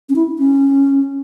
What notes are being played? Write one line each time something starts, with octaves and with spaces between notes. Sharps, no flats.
C#4
E4
C#4